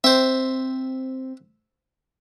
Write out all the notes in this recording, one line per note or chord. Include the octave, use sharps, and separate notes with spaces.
C4 C5 E5